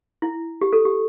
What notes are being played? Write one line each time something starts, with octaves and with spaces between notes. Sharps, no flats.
E4
G4
A4
G4